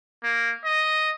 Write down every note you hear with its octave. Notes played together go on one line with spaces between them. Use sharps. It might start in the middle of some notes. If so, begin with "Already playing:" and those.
A#3
D#5